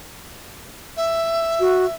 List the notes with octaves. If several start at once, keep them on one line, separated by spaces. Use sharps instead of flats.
E5
F#4